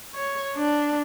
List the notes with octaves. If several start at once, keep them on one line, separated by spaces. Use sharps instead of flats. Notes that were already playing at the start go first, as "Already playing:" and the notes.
C#5
D4